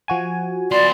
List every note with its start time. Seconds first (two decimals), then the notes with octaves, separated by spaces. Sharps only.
0.08 F3 F#4 G#5
0.72 B3 D5 C6